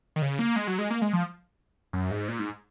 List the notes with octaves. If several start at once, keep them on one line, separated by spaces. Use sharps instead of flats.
D#3
C#3
A#3
G#3
F#3
G#3
A#3
G#3
F3
F#2
G#2
A#2
G#2